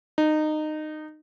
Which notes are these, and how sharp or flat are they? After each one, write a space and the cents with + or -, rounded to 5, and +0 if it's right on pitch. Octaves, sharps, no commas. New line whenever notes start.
D#4 -20